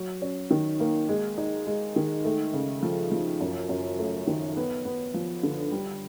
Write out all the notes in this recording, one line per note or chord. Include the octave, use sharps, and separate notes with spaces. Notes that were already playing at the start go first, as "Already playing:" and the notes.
Already playing: F#3
C#4
D#3
A#3
G#3
D#4
G#3
D#3
A3
C#3
F3
F3
F#2
F#2
A3
D#3
B3
B3
F3
D3
G3